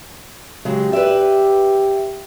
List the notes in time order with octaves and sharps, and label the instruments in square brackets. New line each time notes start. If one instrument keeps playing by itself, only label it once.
[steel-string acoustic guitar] C#3 F#3 G#3 [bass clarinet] G4
[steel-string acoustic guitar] B4 D5 E5